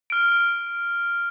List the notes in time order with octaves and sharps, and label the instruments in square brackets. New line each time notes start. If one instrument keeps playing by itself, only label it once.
[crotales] F6 D7